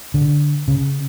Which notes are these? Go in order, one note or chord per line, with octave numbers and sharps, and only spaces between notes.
D3
C#3